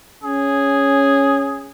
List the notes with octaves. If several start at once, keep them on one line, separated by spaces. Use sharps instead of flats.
C#4 G#4